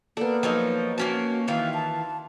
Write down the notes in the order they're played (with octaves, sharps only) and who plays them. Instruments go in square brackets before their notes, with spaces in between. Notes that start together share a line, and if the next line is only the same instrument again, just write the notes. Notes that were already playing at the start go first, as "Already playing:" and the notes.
[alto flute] A#3 [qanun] B3 A4 [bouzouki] D4
[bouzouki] F3 F#3 D#4
[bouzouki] A#3 C#4 A5 [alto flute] F#4
[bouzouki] D#3 E3 F4 [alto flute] F5
[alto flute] A5